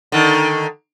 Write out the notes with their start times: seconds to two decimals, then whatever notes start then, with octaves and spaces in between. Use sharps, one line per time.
0.12 D3 D#3